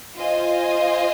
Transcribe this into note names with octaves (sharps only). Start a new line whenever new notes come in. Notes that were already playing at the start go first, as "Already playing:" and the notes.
F4 C5 D#5 G#5